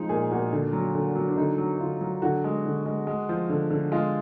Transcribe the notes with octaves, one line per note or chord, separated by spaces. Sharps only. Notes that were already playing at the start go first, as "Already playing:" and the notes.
Already playing: F3 G#3 D#4
A#2 G#4
A#2 F#4
D3
F#3
D3
F#3
D4
D3 D#4
F#3
D3 F4
F#3
D3 F#4
G#3
D3
G#3
G#3
F3
D3
D3
G#3 F4